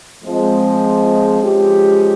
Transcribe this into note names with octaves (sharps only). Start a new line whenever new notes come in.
F3 G#3 C4
F3 G#3 C#4 G4